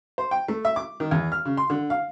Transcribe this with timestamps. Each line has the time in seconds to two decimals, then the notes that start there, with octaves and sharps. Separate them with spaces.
0.18 C5
0.31 G5
0.48 A3
0.65 E5
0.76 D6
1.00 D#3
1.11 E2
1.32 F6
1.45 C#3
1.57 C6
1.70 D3
1.90 F5